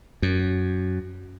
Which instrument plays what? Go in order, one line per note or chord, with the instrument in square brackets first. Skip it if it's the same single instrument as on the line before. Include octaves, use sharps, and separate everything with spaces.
[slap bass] F#2